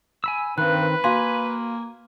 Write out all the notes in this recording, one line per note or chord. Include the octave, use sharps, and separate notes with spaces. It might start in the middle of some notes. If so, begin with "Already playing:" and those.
G#5 B5 E6
G2 D#3 C4 B4 F#6
A#3 F#4 F5 G#5 C6